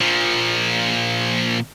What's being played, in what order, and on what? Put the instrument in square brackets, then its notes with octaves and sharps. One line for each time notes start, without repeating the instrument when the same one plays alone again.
[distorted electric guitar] A#2 F3